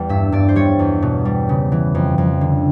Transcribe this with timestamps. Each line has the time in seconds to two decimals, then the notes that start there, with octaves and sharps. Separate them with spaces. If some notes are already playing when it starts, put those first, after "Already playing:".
Already playing: E2 G3
0.09 G2 E5
0.32 G2 D5
0.48 C5
0.55 G3 C#5
0.79 E2
1.02 B2
1.25 G3
1.49 C#3
1.72 E3
1.95 F2
2.18 F2
2.41 D3